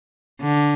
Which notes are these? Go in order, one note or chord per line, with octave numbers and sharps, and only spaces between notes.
D3